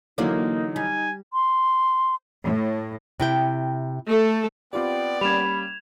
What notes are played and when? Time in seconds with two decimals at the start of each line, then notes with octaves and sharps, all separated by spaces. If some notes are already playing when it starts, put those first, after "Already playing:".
0.18 D3 E3 F#3 A#3 D#4 F4 D5
0.76 G3 G#5
1.33 C6
2.44 A2
3.20 C3 E4 G5
4.07 A3 A4
4.73 B3 C4 F4 G4 D5 G5
5.21 G3 A#3 C#4 B5 G#6 E7 F7